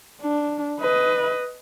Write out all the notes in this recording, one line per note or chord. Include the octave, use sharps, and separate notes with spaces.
D4
B4 D#5